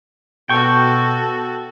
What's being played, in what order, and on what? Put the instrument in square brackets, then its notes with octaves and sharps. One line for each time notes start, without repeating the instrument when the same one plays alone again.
[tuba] B2 [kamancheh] F#4 A4 [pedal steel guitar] G5 C#6